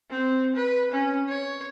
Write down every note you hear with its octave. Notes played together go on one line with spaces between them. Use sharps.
C4
B4
C#4
C#5